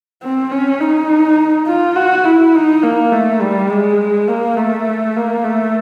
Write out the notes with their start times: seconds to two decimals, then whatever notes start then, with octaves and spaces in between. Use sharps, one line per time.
0.23 C4
0.51 C#4
0.80 D#4
1.67 F4
1.96 F#4
2.25 E4
2.55 D#4
2.83 A#3
3.12 A3
3.41 G3
3.70 G#3
4.28 A#3
4.57 A3
5.17 A#3
5.44 A3